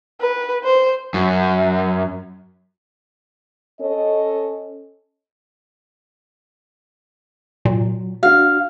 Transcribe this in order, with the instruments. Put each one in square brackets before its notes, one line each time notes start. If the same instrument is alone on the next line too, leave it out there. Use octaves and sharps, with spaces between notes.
[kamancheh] B4
C5
[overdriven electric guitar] F#2
[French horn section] C#4 A4 C#5 D#5
[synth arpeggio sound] A#2 [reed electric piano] F#3
[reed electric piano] D4 F#4 [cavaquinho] F5